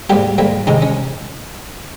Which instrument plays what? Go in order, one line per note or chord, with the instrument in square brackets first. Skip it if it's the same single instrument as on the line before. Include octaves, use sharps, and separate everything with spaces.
[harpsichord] G#2 G3 A#3 G4
G#2 G3 A#3
C3 D#3 G#3 D#4
C#4